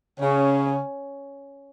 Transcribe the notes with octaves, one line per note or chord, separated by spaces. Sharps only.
C#3 C#4